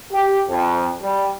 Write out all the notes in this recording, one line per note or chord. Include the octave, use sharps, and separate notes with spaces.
G4
F2
G3